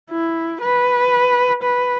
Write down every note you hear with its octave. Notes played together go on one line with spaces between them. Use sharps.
E4
B4
B4